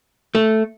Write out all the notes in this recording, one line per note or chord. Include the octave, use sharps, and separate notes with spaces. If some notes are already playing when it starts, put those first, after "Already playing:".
A3